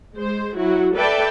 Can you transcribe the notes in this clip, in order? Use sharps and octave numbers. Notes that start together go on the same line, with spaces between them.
G#3 C5
F#3 E4 F#4
A4 B4 D5 E5 G5 A5